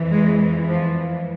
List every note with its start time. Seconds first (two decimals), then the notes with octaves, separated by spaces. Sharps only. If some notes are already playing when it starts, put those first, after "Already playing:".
Already playing: F2 E3
0.11 G#3
0.67 F3